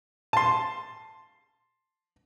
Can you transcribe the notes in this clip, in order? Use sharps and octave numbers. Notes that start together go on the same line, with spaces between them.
A5 C6